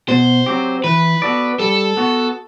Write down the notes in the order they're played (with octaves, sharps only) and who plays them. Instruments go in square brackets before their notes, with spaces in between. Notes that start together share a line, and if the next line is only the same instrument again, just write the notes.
[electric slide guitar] B2 [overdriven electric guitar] C5
[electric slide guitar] F#3 C4 G4
[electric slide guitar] E3 [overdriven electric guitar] B4
[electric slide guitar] B3 F#4 A4 D5
[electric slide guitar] G3 [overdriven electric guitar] A4
[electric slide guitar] B3 F#4